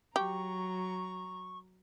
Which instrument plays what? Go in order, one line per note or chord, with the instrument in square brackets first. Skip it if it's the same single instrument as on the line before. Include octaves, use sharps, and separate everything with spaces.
[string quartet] F#3 A#5 [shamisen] G4 [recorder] C#6